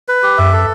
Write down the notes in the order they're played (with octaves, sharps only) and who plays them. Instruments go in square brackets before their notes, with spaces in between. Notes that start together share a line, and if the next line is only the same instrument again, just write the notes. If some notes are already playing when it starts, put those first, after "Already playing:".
[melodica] B4
G4
[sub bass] F#2 [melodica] E5
[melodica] A4